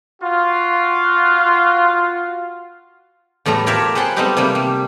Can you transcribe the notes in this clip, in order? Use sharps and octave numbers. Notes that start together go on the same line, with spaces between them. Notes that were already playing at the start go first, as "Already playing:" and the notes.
F4 F#4
E2 A2 G3 A3 A#5
F4 G4 A#4 C#5 D5 E5
G#4 C5 F#5 G5 A5 B5
G3 A3 B3 C4 D#4 G4
C3 G3 A3 A#3
G3